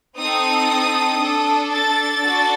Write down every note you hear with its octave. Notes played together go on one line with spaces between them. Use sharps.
C4 D#4 A4 D#6
D4 A4
A6
D4 F#4 A4